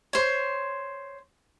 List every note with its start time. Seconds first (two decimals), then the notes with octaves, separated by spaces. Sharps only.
0.13 C5 C#5